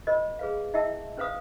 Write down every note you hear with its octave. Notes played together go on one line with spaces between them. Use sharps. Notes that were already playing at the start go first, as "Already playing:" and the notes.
F4 A#4 C5 D#5
G#4 B4 F5
E4 D#5 E5 G5 A5 E6
C#4 B4 C5 F5 D#6